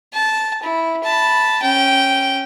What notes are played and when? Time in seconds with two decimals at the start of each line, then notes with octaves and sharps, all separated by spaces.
0.13 A5
0.62 E4
1.03 A5 B5
1.62 C#4 G5